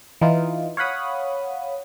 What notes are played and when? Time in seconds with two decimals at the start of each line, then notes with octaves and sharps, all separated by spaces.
0.21 E3 D#4 F4
0.77 C#5 F5 F#5 B5 D#6